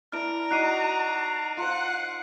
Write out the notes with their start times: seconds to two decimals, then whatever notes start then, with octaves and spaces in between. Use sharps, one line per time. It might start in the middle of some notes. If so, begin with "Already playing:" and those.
0.12 D4 E4 B4 A#5 F6 D7
0.51 D#4 F#4 D6 F#6 C7 D#7
1.57 F4 C5 F#5